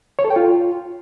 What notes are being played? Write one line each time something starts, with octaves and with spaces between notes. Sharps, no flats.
C#5
A4
G5
F4